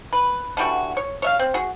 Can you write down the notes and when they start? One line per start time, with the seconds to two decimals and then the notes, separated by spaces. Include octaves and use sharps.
0.13 B4
0.57 D3 E3 G3 F#4
0.97 C#5
1.22 C#5 E5 F5
1.39 C4
1.54 F#4 G#4